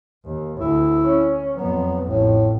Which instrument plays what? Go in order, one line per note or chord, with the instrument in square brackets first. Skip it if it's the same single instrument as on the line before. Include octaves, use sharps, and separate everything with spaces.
[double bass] D#2
[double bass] D2 [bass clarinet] E4
[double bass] C#4
[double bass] F2 B3 [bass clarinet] F#3
[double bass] A1 F2 [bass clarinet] A2